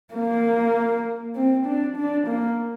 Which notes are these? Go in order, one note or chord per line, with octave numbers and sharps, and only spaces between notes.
A#3
C4
D4
D4
A#3